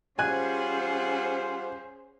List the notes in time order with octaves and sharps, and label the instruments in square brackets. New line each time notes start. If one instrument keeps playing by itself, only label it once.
[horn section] G3 F4 F#5 [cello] C#4 G#4 [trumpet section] C5 [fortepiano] G#5 F#6